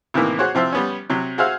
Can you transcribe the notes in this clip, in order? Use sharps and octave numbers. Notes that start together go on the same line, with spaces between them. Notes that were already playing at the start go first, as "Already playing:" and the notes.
A2 C3 D#3 E3 A#3
F#4 G#4 C5 C#5 F#5
C3 F3 C4 E5
G3 B3 C#4
C3 F#3
F#4 G#4 C5 E5 F5